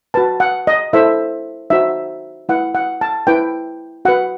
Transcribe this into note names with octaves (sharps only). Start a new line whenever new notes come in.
F#4 B4 A5
F#5
D#5
E4 A4 C5 E5
D#4 F#4 C5 E5
E4 B4 F#5
F#5
A5
E4 B4 G5
F#4 B4 F#5